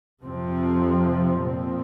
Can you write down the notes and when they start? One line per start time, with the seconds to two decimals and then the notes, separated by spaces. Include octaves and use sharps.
0.23 F2 C3 F3 C4
1.41 A#2 F3 C4